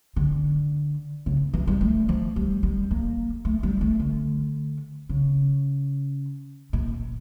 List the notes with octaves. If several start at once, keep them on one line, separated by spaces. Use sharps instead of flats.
D3
C#3
E3
G3
A3
F3
G3
G3
A#3
A3
G3
A3
D3
C#3
A#2